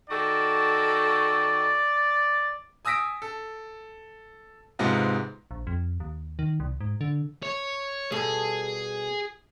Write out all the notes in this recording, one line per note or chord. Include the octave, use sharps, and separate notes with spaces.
D#3 F#4 A4 D5
G#5 D#6 E6 A#6 B6 D7
A4
G#2 C3 G#3 B3 D#4 F4
A#1
F2
D#2
D#3
C2
G#2
D3
C#5
B2 G3 G#4 A4